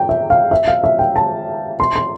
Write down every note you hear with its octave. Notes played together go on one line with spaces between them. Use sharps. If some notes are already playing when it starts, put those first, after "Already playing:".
Already playing: G5
E5
F5
E5
F5
E5
G5
A5
C6
C6